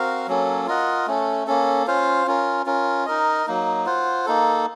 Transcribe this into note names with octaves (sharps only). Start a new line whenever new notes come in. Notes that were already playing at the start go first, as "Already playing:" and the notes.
Already playing: C4 F#4 A#4 F5
F#3 A#3 C#4 A4
F4 A#4 D#5 F#5
A3 C#4 A4
A#3 C#4 A4
C#4 F4 C5 F5
C#4 F4 A#4
C#4 F4 A#4
D#4 A#4 D#5
F#3 A#3 D#4
F4 C5 F#5
A#3 D#4 A4